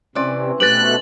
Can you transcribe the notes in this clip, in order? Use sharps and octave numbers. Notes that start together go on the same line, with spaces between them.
C3 E3 C4 C#4 B4 D5
B2 A3 G4 B4 F#6 A6 F#7